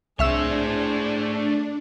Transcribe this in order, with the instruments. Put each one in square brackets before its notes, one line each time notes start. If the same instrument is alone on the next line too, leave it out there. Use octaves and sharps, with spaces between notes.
[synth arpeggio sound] C2 E5 E6 [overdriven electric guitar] A3 C#5 [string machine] D4 [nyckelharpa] G#4 C5